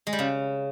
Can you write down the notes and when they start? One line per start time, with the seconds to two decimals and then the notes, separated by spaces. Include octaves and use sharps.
0.07 G#3
0.13 G3
0.19 C#3